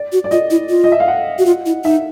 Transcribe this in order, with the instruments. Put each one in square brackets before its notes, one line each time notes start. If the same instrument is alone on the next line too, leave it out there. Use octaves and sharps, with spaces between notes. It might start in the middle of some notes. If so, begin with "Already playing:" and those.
Already playing: [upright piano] D5
[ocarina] F#4
[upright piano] D5
[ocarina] F4 [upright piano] D#5
[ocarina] E4
F4
[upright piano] D#5
E5
F5
F#5
[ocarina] F#4
F4
E4
[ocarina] D#4 [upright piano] E5